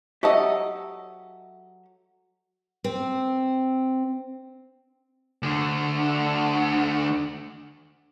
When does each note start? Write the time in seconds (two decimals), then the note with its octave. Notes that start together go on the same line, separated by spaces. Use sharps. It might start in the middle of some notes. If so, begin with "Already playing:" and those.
0.23 F#3 G4 A4 D#5 E5
2.84 C4
5.43 D2 D3